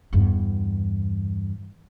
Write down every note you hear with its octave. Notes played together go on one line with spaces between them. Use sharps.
E2 G2